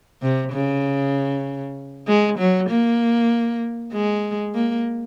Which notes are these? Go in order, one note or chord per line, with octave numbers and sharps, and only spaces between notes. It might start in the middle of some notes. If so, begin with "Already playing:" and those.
C3
C#3
G#3
F#3
A#3
G#3
A#3